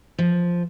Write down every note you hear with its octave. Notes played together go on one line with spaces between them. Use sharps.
F3